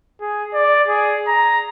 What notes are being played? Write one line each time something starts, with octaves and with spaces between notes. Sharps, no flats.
G#4
D5
G#4
A#5